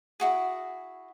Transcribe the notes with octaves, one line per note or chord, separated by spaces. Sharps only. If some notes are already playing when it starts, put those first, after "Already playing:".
E4 F#4 G#4